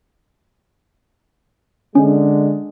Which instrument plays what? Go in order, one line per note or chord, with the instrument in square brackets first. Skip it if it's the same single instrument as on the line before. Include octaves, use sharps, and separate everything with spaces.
[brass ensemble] D3 G#3 [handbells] C#4